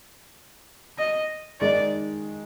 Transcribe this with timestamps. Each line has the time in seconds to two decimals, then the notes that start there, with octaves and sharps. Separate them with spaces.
0.98 D#5
1.60 D#3 G#3 D#4 D5